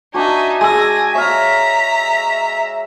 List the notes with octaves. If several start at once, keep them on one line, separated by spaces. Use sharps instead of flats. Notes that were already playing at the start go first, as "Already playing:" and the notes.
D4 D#4 F#4 E5 G#5
G#3 G#5 E6 A#6
C#5 E5 F5 A#5 B6